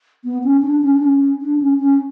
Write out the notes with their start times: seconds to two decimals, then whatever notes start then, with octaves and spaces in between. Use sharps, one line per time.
0.24 B3
0.43 C#4
0.62 D4
0.82 C#4
0.96 D4
1.02 C#4
1.41 D4
1.60 C#4
1.80 C#4